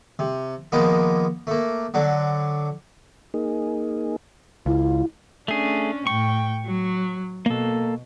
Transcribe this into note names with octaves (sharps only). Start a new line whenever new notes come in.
C3
D#3 F3 G#3 A#3 B3
A3 A#3
D3 F#3 D4
A#3 D#4 G#4
C#2 E4 F4
A3 C#4 D4 G#4
A2 G5 C#6
F#3
B2 A#3 A4